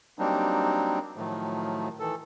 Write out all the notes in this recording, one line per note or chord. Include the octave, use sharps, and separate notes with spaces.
F#3 G3 A#3 C4 D4 D#4
A2 D#3 F3 F#3 A3
D#3 E3 A4